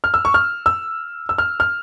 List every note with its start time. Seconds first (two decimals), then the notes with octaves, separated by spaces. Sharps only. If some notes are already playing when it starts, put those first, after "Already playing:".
0.04 F6
0.14 E6
0.25 C#6
0.34 F6
0.66 E6
1.29 E6
1.38 F6
1.60 F6